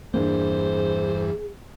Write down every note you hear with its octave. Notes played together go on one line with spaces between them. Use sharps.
E2 G2 A#3 C4 D4 G#4 C5